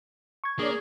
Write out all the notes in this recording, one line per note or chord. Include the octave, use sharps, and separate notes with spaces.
C#6 G#6
A#3 D4 G#4 C#5 D5